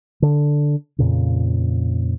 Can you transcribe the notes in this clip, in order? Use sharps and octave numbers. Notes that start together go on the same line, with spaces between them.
D3
F2 A#2 C#3